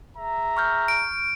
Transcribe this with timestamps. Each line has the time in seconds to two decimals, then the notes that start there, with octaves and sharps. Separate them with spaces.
0.16 G#4 E5 A#5
0.57 C#6 F6 G6
0.88 D7